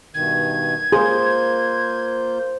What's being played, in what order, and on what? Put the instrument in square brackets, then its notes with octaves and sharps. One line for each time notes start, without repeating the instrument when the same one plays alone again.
[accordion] G2 B2 D#3 [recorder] G#6
[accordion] A#3 F4 G6 [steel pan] G#4 [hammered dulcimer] C5